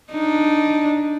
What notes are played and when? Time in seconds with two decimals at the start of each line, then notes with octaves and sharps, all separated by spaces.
0.11 D4 D#4